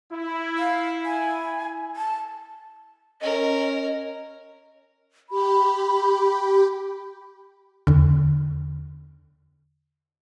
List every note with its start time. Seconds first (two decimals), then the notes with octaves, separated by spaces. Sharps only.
0.12 E4
0.58 F5
1.06 G#5
1.96 A5
3.21 C#4 A#4 D#5
5.30 G4 B5
7.87 E2 D3